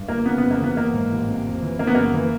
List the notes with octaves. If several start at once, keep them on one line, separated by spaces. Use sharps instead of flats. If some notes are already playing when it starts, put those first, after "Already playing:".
Already playing: G2
G1 A#3
C#3 B3
F2 B3
A#3
E3 B3
E3 A#3
G#2
A1
C3
F2
E3
C#3 A#3
B3
F#2 A#3
E3